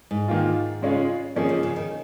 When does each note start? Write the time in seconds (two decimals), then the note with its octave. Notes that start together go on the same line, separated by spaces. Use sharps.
0.11 G#2
0.28 D#3 A#3 F4
0.82 C#3 G#3 C#4 F4 G#4
1.36 D#3 F3 A#3 C#4 G#4
1.49 C#3
1.63 C#3
1.76 D#3